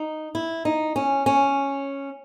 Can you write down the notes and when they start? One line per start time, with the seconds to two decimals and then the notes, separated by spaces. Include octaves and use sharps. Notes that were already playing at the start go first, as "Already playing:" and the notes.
Already playing: D#4
0.35 E4
0.65 D#4
0.96 C#4
1.26 C#4